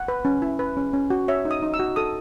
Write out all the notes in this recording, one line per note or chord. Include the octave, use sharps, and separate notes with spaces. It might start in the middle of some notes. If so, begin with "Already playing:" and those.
Already playing: F#5
B4
C#4
E4
B4
C#4
C#4
F#4
C#5 E5
D#4
D#6
D#4
E6
F#4
A4 D#6